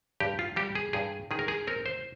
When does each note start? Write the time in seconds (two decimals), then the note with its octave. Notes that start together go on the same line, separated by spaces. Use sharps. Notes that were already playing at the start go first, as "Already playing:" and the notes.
0.20 G2 G4
0.39 F4
0.56 G3 G4
0.75 G#4
0.93 G2 G#4
1.31 D#3 G#4
1.39 A#4
1.48 G#4
1.67 C4 A#4
1.86 C5